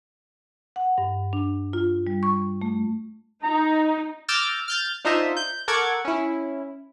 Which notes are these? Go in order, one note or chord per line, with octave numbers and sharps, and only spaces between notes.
F#5
G2
D4
F4
G3
C#6
A3
D#4 A#5
D6 E6 F6 G6 A6 A#6
F6 G6 A6
D4 D#4 F4 C5 D#5 E5
G6
A4 A#4 F#5 C#6 D6 G#6
C#4 E4